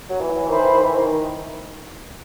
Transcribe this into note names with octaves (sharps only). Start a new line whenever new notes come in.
F#3
E3
D#3 C5 E5 B5
E3
D#3
E3
D#3